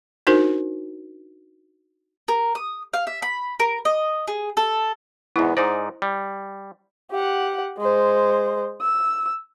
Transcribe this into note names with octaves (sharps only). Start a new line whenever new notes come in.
D4 D#4 F#4 A#4 C5
A#4
D#6
F5
E5
B5
A#4
D#5
G#4
A4
E2 G#2 B3 E4
G#2 D#4 C5 D5
G3
G4 F#5
G#3 C5
E6